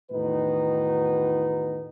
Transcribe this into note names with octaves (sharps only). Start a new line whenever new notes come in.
E2 A2 D#3 D#4 F#4 B4